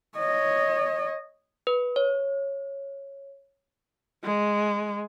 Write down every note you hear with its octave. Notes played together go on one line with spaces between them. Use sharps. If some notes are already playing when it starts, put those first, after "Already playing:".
C#5 D#5
B4
C#5
G#3